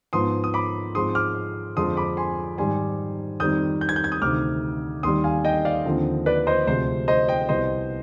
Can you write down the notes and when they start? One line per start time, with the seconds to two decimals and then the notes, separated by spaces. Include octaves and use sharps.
0.13 G#2 F3 B3 C6 D#6
0.44 D#6
0.54 B5 D6
0.95 G#2 F3 G#3 C4 C6 D#6
1.15 D6 F6
1.77 F2 D3 F3 G#3 C6 D#6
1.97 B5 D6
2.17 G#5 C6
2.58 G#2 D#3 G3 G#5 C6
3.40 F2 D#3 G3 C4 D#6 G6
3.81 G6
3.89 G#6
3.96 G6
4.04 G#6
4.12 D#6 G6
4.22 D2 C3 D#3 D6 F6
5.03 D#2 D#3 G3 C6 D#6
5.24 F5 G#5
5.45 D#5 G5
5.65 D5 F5
5.86 D#2 D3 F3 C4
6.26 B4 D5
6.47 C5 D#5
6.67 D2 C3 F3 G#3 C5
7.08 C5 D#5
7.29 D#5 G5
7.49 C2 B2 B3 C5 D#5